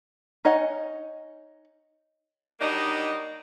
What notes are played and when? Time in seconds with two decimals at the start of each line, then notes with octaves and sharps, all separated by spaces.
0.45 D#4 C#5 D#5 F#5 G#5
2.60 F#3 G3 A#3 D4 D#4 D#5